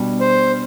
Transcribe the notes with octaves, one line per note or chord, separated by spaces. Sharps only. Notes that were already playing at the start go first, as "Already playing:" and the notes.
Already playing: B2 G3 D4
C5